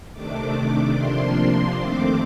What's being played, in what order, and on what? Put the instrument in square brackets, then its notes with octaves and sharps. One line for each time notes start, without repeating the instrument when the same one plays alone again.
[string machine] C3 D#3 A3 D4 D6
C3 F3 A#3 D4 C6
F2 D#3 A3 C4 D6